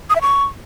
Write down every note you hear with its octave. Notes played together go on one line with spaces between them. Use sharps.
D#6
E5
C#6